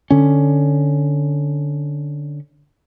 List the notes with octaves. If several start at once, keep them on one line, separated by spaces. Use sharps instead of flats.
D3 C#4